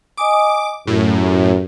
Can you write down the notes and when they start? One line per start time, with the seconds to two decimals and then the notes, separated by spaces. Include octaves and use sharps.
0.17 D#5 G#5 D6 D#6
0.87 F#2 A2 G4